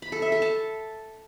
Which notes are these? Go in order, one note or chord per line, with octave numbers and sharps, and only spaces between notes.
B5
A4
E5
A4
A5